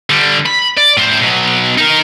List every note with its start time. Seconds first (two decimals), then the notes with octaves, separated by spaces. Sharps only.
0.10 D3 G3
0.46 B5
0.77 D5
0.97 A2 C5
1.23 B2 F#3
1.78 D#4 A#4